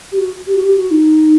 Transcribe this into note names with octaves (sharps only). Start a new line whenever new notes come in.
G4
F#4
G4
F#4
G4
F#4
D#4